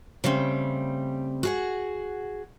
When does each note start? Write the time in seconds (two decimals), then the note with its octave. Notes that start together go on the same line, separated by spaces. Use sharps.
0.24 C#3 G3 A3 C4
1.43 F#4 G#4 F#5